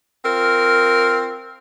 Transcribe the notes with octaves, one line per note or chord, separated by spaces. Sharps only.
C4 F4 A#4